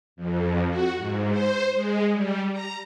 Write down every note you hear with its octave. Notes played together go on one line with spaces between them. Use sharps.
F2
F#4
G#2
C5
G#3
G3
A#5